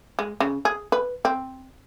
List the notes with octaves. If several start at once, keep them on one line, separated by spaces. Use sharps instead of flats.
G#3
C#3
G#4
B4
C4